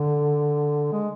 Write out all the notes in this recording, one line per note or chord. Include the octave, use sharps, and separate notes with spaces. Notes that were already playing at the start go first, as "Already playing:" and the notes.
Already playing: D3
G#3